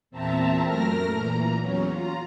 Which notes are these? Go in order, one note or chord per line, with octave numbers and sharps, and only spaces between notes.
E2 A#2 C4 E5 A5 A#5
F#2 A3 A#4 F6 A#6
A#2 E3 A#5
E2 F#3 C#4
F4 A#5